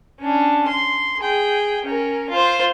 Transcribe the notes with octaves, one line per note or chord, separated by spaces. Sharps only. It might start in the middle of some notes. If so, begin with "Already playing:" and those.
C#4 D4
C6
G#4 G5
C#4 A#4
F4 C5